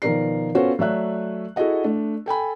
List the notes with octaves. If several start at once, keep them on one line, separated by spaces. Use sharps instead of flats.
B2 D#3 F3 A#4 D5 C7
B3 C#4 F4 F#4 A4 C5
F#3 A3 D5 E5 F#6
E4 F#4 G#4 A4 D#5 F#5
A3 D4
A4 G5 G#5 B5